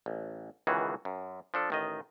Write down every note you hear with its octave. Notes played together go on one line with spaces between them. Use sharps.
A1
C#2 D#3 E3 F#4 G#4
F#2
F3 D4 A4
A1 D#3 D#5